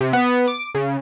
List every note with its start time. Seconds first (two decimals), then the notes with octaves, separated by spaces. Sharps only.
0.01 C3
0.13 B3
0.47 D6
0.75 C#3